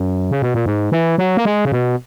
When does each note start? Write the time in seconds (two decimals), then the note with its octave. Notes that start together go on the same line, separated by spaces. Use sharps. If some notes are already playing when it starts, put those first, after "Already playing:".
Already playing: F#2
0.31 C#3
0.42 B2
0.54 A#2
0.66 G#2
0.92 E3
1.18 F#3
1.37 A#3
1.45 G#3
1.65 C#3
1.72 B2